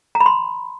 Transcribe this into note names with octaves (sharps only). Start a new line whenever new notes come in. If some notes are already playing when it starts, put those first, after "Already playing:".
A#5
B5
C6